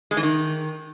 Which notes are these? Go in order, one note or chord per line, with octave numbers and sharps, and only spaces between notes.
G#3
E3
D#3